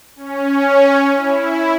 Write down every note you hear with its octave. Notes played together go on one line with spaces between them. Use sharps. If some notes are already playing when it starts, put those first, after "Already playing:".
C#4
E4